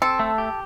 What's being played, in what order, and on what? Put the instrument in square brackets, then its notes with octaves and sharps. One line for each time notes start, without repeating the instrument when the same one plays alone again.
[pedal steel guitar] C4 [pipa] A4
[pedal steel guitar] A3
G4